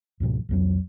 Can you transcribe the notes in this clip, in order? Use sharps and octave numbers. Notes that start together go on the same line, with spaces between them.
C#2 G#2 B2 F3
C2 F2 F#3